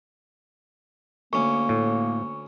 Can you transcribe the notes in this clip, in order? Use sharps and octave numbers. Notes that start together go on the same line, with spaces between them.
D2 A#3 C#4 C#6
A2